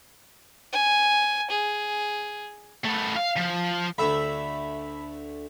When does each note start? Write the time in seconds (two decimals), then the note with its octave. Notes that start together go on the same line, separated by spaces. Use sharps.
0.73 G#5
1.51 G#4
2.85 A3 B3
3.16 F5
3.36 F3
3.98 D2 A3 E5 B5